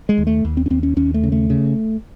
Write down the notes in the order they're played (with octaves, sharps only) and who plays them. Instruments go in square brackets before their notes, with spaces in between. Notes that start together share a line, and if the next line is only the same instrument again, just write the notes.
[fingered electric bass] G#3
D#2
A3
D#2
C4
C#4
D#2 C4
C#4
D#2 C#4
A3
C#3
A3
C#3